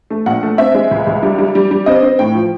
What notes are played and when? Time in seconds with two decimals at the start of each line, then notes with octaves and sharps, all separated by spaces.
0.10 A3
0.26 A#1 F#5
0.43 A3
0.58 C4 E5
0.75 G#3
0.91 C#2
1.07 C#2
1.23 G3
1.38 G3
1.55 G3
1.71 G3
1.86 C4 D#5
2.03 C4
2.19 A2 G5
2.35 F3